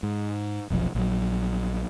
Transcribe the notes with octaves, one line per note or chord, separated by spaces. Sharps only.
G#2
F1 B1 G#2 F3
A#1 F#3